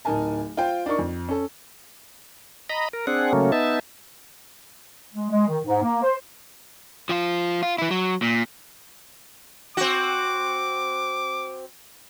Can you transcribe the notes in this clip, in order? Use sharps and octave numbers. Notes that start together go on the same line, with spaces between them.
D1 D#4 A#4 G#5 A5
F4 C5 G5
D4 D#4 A#4 C#6
F2
C#4 A4
D#5 A#5 B5
A#4
C4 D4 G#4 F#5
C#3 F#3 A3 A#3 C#4
B3 D#4 E5 A5
G#3
G#3
D#3
G#2
A#3
C5
F3 F4
F4
E3 E4
F#3
A#2
C4 F#4 D6